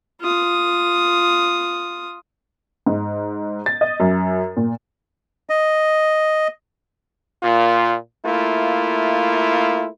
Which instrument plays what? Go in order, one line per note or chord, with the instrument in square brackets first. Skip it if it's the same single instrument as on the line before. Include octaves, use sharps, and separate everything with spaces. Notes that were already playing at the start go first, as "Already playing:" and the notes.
[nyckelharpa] F4 D#6
[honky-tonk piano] G#2
A6
D#5
F#2
A#2
[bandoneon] D#5
[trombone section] A#2 F4
A3 A#3 E4 F4